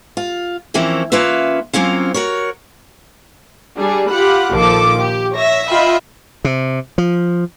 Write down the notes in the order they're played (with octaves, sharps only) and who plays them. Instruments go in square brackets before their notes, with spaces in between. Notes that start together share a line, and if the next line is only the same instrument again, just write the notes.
[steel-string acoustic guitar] F4
E3 F3 A#3 C4 C#4 E4
A#3 C#4 F4 B4 E5
F#3 A#3 C4 C#4 F4
F#4 A#4 C#5
[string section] G3 D4 G#4
F4 G4 F#5 B5
A#1 D#3 F3 A4 D6
G4
C#5 E5 A#6
F4 D#5 E5 G5 B5
[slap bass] C3
F3